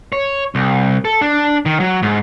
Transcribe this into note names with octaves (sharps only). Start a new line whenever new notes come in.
C#5
C2
A4
D4
D#3
F#3
G#2